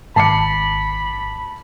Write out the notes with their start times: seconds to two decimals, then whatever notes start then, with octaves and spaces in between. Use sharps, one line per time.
0.16 G#1 A5 B5 D6 C7 C#7